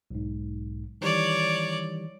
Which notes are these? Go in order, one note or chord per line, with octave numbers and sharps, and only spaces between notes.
B1 G#2
D#3 E3 G3 C#5 D5